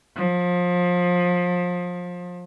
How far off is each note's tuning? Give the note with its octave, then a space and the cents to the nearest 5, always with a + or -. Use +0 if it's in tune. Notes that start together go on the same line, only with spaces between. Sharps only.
F3 +25